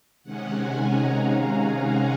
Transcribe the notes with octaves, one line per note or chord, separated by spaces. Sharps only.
C3 D#3 G#3 C#4 F#5
G#5
A#5
F5
F#5